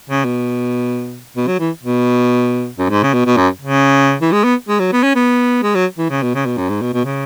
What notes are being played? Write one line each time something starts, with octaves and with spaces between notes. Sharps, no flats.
C#3
B2
B2
F#3
E3
B2
F#2
G#2
C#3
B2
B2
F#2
C#3
E3
G#3
B3
G#3
F#3
B3
C#4
B3
G#3
F#3
E3
C#3
B2
C#3
B2
F#2
G#2
B2
B2
C#3